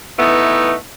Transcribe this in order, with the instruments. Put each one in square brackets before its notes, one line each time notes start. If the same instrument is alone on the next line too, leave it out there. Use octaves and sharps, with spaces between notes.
[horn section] E3 A3 B3 D#4